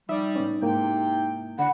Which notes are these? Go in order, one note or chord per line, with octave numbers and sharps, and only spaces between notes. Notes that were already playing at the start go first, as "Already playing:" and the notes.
F3 G3 D#4 E5
A2 B3 C#4
G#2 C3 A#3 E4 G5
D3 D4 F#5 B5